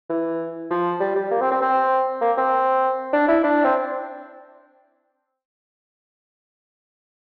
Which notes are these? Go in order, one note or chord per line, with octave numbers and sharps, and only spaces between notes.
E3
F3
G3
G3
A#3
C4
C4
C4
A#3
C4
D4
E4
D4
C4